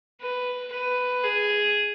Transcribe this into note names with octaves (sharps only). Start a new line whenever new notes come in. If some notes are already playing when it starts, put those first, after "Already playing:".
B4
B4
G#4